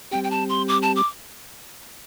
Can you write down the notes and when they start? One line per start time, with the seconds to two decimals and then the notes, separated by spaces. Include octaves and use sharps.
0.11 G3 C4 G4 G5
0.24 G5
0.31 A5
0.49 C6
0.68 D6
0.82 A5
0.96 D6